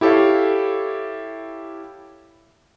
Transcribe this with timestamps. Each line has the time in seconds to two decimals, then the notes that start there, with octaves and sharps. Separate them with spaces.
0.01 E4 G4 A4 C#5 F5